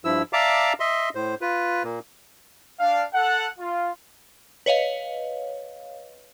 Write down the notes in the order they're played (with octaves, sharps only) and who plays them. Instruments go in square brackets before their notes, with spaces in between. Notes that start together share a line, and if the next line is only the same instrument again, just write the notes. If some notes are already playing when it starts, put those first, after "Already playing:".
[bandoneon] G2 F3 E4 E6
D5 E5 F5 A5 A#5 D6
D#5 E5 C6
A2 C5
F4 B4
A#2 A#3
[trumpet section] D4 F5
A4 F#5
F4
[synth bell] B4 C#5 D#5 F5